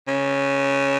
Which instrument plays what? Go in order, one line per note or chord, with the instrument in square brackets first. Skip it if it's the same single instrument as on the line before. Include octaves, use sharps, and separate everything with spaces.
[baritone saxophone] C#3